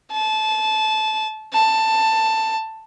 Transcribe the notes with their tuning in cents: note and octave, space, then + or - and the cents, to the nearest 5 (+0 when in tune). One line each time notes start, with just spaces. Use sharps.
A5 -20
A5 +10